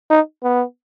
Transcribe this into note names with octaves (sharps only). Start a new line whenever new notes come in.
D#4
B3